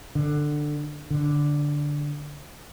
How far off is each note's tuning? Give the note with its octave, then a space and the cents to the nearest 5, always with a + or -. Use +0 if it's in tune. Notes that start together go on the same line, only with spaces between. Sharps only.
D3 +15
D3 -5